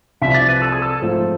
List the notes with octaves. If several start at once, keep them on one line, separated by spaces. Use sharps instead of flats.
C2 C3 F3 E5
D5
B4
A4
G#4
A4
G#2 F3 A3 C4